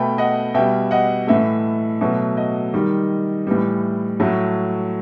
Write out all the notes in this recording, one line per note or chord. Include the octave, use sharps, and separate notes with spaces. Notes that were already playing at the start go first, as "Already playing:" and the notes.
Already playing: B2 A3 G5 B5
D#5 F#5
B2 G3 E5 G5
D#5 F#5
A2 E3 A3 E5
B2 F#3 A3 E5
D#5
D#3 G3
A2 E3 G3
A2 F#3 A3